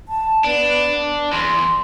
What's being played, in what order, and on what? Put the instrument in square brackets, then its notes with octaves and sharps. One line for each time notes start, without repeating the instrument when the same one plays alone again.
[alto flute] A5
[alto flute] B3 [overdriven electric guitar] D4
[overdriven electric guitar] E2 [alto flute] C6